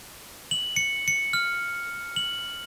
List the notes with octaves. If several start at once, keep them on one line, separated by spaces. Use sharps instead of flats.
F#7
C#7
C#7
F6
F#7